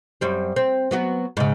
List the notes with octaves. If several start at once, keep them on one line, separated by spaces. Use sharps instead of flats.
F#2 G3 C4
C4
F#3 B3 F#4
G#2 C#3